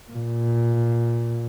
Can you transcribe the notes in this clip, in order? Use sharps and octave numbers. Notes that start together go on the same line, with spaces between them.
A#2